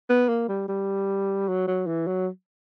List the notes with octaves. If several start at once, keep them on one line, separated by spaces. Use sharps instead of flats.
B3
A#3
G3
G3
F#3
F#3
E3
F#3